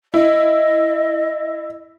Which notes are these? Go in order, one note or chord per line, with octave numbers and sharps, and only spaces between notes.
E4 D#5